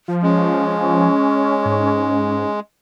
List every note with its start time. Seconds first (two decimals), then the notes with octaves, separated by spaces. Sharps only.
0.08 F3
0.23 G#3 C#4
1.65 G#2